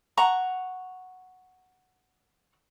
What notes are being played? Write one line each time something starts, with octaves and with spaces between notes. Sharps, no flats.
F#5 A#5 C#6